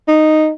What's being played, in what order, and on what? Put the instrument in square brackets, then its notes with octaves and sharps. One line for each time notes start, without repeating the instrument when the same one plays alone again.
[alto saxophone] D#4